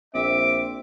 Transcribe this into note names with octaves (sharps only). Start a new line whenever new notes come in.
A#1 C4 E5 D6